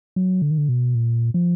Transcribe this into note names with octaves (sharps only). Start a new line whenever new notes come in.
F#3
D3
D#3
D3
B2
A#2
F3